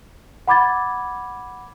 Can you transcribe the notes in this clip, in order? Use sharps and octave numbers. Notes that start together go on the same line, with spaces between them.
F#5 B5 D6 G#6 A6